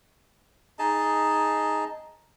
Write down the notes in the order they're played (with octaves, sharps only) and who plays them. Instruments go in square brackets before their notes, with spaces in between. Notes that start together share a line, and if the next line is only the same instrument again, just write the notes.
[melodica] D#4 G#4 D#5 A5